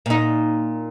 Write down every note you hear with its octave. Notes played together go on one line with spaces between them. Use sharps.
A#2 D#4